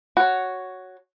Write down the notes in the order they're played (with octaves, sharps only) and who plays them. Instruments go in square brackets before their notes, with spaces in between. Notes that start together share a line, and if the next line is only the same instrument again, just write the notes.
[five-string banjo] F#4 C#5